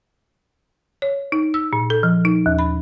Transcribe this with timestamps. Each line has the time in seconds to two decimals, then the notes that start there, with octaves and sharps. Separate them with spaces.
1.02 C#5
1.32 D#4
1.54 E6
1.73 A#2
1.90 A4
2.03 F3
2.25 D#4
2.46 D#2
2.59 B5